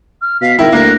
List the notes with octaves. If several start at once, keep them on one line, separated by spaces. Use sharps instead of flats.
F6
B2 F5 B6
G#1 E4 A#4 G5
D2 A#3 A#4 F#6